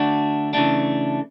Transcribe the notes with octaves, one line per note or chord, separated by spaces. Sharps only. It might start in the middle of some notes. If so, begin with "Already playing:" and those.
Already playing: D3 A3 D4 F#4
C#3 E3 A3 D4